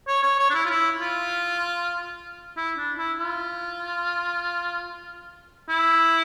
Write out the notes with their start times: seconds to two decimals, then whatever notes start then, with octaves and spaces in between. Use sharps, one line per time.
0.07 C#5
0.23 C#5
0.39 C#5
0.50 D4
0.54 E4
0.66 F4
0.69 E4
1.01 F4
2.57 E4
2.78 D4
2.98 E4
3.19 F4
5.69 E4